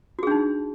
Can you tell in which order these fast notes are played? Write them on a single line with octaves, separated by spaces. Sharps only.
F#4 G#4 D4 D#4